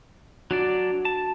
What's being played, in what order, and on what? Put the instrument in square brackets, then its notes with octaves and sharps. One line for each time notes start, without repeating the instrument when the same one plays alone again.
[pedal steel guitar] F#3 D4 D5 [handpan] F#4
[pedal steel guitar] A5